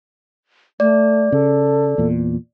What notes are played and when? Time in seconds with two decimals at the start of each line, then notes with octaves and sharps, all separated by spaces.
0.80 A3 D5
1.32 C#3 A4
1.98 E2 A#2